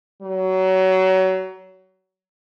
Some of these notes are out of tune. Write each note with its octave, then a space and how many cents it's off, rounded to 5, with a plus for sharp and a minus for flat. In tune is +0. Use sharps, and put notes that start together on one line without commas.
F#3 +25